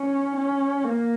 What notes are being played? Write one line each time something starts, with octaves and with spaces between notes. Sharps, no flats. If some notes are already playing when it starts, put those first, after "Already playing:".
Already playing: C#4
C#4
A#3